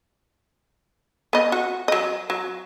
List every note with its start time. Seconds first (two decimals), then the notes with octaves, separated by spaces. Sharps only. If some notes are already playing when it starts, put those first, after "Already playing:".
1.33 B3 D#5
1.52 F#4
1.88 F#3 D#5
2.30 F#3